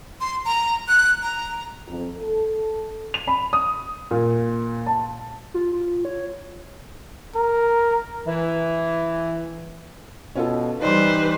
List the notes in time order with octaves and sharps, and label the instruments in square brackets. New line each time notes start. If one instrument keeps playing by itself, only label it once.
[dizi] C6
A#5
F#6
A#5
[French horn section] F2
A4
[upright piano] F7
B5
D#6
A#2
A5
[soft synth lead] F4
F4
C#5
[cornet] A#4
[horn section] E3
[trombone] B2 [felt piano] C#4 F4 A4
[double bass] E3 G3 [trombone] D#4 [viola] B4 C5 [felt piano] D5 C6